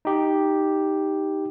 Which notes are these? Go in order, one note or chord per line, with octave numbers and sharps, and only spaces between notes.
D#4 G4